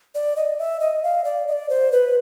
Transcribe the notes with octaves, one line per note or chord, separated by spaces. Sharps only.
D5
D#5
E5
D#5
F5
D5
D#5
D5
C5
B4